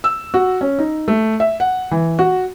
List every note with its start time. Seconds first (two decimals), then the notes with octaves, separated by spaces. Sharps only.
0.04 E6
0.34 F#4
0.61 C#4
0.79 D#4
1.08 A3
1.40 E5
1.60 F#5
1.91 E3
2.19 F#4